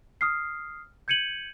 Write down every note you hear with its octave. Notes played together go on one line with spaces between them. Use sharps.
D#6 F6 C7
G6 G#6 C#7 D#7 F#7